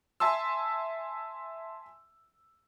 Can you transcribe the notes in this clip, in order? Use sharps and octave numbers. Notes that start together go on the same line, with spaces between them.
E5 G#5 A5 C6 E6